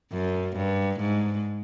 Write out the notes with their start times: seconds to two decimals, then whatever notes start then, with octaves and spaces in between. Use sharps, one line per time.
0.13 F#2
0.57 G2
1.01 G#2